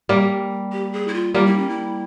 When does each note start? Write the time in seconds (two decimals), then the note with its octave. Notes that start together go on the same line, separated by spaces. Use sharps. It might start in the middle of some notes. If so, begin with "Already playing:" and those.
0.09 G3 A#3
0.72 G4
0.93 G#4
1.08 E4
1.14 F4
1.34 G3 A#3 F4
1.46 E4
1.57 C#4
1.69 E4